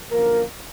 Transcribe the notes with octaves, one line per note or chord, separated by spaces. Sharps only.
F#2 D3 F3 A#3 A#4